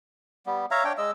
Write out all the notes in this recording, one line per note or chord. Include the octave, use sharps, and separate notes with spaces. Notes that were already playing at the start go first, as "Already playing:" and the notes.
G3 B3
C#5 E5 F5 A#5
D4 C#5 G5
G#3 D#5 E6